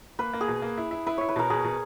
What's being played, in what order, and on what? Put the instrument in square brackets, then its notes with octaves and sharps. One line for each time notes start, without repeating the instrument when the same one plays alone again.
[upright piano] A#3 [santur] B4
[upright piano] A#3
[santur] G#4
[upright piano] B2
A#3
E4
E4
[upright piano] E4 [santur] B4
[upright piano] E4 [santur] C#5
[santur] B4
[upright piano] B2 [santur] A#4
[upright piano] B2 [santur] G#4
[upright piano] B2